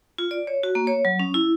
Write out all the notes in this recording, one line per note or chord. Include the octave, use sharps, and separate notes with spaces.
F4
D5
C#5
F#4
A#3
C#5
F#3
C#4
E4